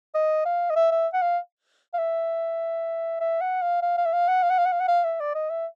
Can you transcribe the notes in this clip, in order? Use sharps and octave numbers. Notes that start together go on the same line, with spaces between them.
D#5
F5
D#5
E5
E5
F#5
F5
F5
E5
E5
F#5
F5
F5
F5
E5
F5
F#5
F5
F#5
F5
F#5
F5
F#5
F5
E5
D5
D#5
E5